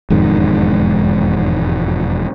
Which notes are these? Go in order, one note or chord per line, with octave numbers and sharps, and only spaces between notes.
E1 F2 G#2 D#3